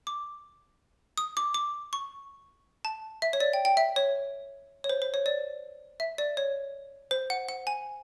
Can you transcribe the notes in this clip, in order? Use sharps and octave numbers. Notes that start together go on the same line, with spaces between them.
D6
D#6
D6
D6
C#6
A5
E5
C#5
D5
G5
G5
E5
C#5
C#5
C5
C5
C#5
D5
E5
D5
C#5
C5
F#5
F#5
G#5